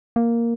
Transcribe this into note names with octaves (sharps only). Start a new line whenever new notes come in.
A#3